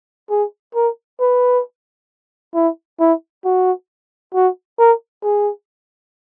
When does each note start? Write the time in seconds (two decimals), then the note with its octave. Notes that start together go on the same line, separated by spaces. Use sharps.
0.30 G#4
0.75 A#4
1.20 B4
2.54 E4
3.00 E4
3.45 F#4
4.34 F#4
4.79 A#4
5.23 G#4